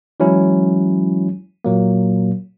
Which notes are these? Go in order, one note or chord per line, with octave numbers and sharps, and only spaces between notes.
E3 F#3 G#3 C#4 E4
A#2 F#3 A#3